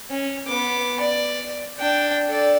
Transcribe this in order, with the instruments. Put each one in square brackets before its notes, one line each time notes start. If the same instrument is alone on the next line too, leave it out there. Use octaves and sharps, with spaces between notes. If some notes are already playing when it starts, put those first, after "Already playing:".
[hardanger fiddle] C#4
B3 D6
D5
D4 G5
A4 D5